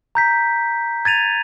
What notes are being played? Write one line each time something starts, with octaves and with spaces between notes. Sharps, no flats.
A#5 G6 B6
G#6 A6 D#7 F7